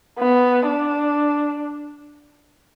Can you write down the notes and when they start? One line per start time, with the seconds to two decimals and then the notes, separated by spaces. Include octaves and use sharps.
0.19 B3
0.67 D4